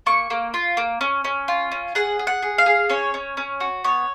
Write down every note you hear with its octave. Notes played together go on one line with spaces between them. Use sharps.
A#3 C#6
A#3
F4
A#3
C#4
C#4
F4
C#4
G#4 F#5
G#4
F#5
G#4
F5
G#4
C#4 C#5
C#4
C#4
F#4
B3 C#5